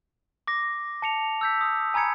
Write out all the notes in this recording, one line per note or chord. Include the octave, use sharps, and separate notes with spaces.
D6 A#6
A5 C#7 F7
E6 G6 B6
D#6
G#5 A#5 B5 G#6 C#7